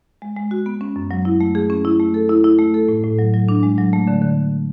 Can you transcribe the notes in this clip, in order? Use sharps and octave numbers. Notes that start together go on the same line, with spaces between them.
G#3
G#3
F#4
B3
C#4
F#2
F#3
E4
A3
G#4
C#4
E4
A3
A4
E4
E4
A3
A4
A2
A2
F#3
F#3
D4
G#3
F#3
A3
D3
D3